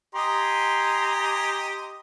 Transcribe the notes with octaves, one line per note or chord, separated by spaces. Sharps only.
G4 D#5 G#5 A#5 C6